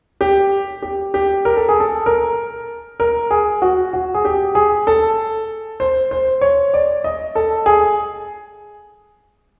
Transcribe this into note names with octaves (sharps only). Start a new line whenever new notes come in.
G4
G4
G4
A#4
A4
G#4
A4
A#4
A#4
G#4
F#4
F#4
G#4
G4
G#4
A4
C5
C5
C#5
D5
D#5
A4
G#4